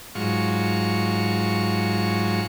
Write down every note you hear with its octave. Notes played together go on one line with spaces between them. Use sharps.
G#2 F#3 F4 C#6